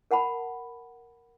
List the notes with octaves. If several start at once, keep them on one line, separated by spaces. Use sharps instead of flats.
A#4 F#5 A5 B5